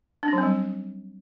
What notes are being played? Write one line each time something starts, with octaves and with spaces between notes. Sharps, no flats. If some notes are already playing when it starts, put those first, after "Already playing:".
D4
C#4
F#3
C4
G3